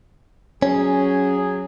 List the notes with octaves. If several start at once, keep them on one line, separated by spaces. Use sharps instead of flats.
F#3 C#4 G#4